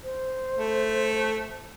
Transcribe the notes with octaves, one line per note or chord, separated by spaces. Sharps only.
C5
A3